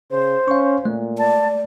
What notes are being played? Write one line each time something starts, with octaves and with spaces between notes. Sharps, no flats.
C#3 C5
C#4 F5 C#6
A#2 A3
D5 A5